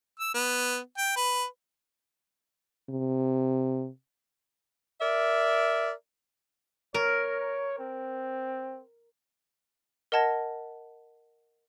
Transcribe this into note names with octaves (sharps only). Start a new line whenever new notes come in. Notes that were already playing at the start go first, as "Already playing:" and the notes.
E6
B3
G5
B4
C3
A#4 D5 E5
A#4 C#5
C4
A#4 D#5 F#5 A5 G#6 A#6